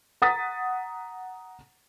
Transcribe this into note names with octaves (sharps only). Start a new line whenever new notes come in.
F#5 A#5 D#6 A6 B6